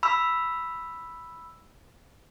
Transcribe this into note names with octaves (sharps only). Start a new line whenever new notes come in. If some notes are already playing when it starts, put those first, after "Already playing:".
B5 E6